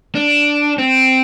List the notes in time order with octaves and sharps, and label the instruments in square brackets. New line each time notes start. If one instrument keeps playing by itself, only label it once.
[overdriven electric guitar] D4
C4